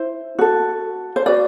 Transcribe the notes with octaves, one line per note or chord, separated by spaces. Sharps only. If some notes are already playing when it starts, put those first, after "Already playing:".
Already playing: E4 C5
F#4 A4
C5
F#4 B4 D5